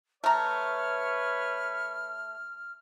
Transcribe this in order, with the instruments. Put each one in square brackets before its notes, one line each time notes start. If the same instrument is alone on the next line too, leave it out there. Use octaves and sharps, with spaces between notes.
[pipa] A3 A#5 [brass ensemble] B4 C#5 [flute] F6